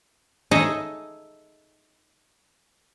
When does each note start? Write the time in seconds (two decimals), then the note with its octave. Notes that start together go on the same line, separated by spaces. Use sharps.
0.51 D#4 G#4 A4 C#5 D#5 E5